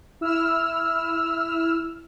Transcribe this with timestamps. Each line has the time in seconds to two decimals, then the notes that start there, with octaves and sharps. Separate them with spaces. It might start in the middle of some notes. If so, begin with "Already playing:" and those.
0.21 E4 E6 F6